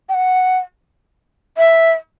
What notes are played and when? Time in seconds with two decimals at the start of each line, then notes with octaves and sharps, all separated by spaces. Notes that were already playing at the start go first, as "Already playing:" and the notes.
0.09 G5
0.14 F#5
1.58 E5